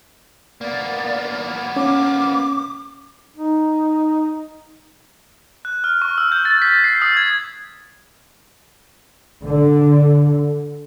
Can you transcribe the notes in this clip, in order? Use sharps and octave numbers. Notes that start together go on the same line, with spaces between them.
A#3 B3 D5
C#4 D6
D#4
F#6
F6
C#6
E6
G6
A6
B6
C7
D#6
G#6
D3